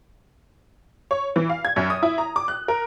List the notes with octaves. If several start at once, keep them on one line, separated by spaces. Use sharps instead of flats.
C#5
E3
F5
G#6
F#2
D#6
E4
A#5
D6
F#6
A#4